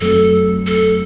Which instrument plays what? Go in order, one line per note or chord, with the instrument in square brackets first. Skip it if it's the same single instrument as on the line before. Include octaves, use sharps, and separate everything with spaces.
[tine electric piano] F#2 F#3 A3 C4 [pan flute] A4
[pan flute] A4